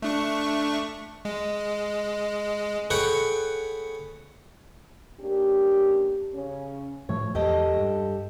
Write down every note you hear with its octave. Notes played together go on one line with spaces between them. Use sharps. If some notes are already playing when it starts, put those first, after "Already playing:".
A3 D4 C#6
G#3
G#4 A4 B4 C#5 F#5 G5
A#3 C#4 D4 G4
C#3 C#4
A2 F3 A3 C#5
E2 G#3 G4 A4 D#5
G2